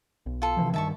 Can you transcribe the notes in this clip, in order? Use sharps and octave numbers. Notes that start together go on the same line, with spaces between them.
B1
F4 A4
C3 E3 F3
G2 D#3 E5 A5 C#6